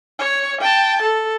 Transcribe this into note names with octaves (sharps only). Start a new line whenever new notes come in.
C#5
G5 A5
A4